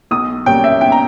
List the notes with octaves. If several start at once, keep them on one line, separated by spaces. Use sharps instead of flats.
B1 D#6
A#2 G3 C#4 G5
E5
B1 G5
A#5